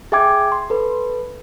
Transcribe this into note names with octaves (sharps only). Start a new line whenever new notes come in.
G#4 E5 G5 D6 G#6
C6
A4 B4